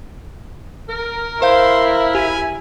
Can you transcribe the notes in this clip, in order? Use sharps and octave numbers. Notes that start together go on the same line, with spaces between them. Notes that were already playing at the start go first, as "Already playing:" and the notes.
A#4
E4 C5 F5 C6 G6
G4 G#5 B6